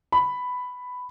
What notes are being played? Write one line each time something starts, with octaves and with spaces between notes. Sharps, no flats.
B5